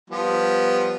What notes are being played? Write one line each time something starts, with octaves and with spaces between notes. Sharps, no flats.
F3 G3 B3